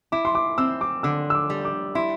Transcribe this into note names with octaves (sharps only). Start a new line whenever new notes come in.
E4 D6
C6
D6
C4 E6
D6
D3 E6
E6
D6
G3
D6
E4 C6